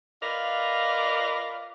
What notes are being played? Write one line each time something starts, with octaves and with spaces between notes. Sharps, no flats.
F4 A#4 B4 D5 D#5 F5